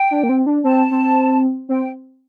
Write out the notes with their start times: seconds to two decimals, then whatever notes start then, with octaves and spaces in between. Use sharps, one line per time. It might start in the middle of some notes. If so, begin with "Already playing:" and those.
Already playing: G5
0.11 D4
0.23 A#3
0.29 C4
0.46 D4
0.64 C4 A5
0.91 C4
1.69 C4 G5